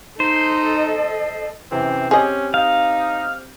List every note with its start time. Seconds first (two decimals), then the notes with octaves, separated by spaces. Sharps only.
0.20 D#4 A4 C5 D#5
1.72 F#2 C3 E3 C4
2.11 C4 C#4 G4 G#4 C5 D#5
2.54 D#4 F5